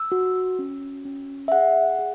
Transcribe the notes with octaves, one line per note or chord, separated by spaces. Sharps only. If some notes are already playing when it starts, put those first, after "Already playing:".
Already playing: E6
F#4
C#4
C#4
E5
G#4 F#5
G#4